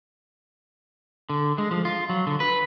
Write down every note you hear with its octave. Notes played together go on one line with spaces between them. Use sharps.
D3
G#3
F3
F4
F#3
D3
B4